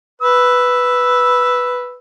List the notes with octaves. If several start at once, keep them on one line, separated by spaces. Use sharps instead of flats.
B4 E6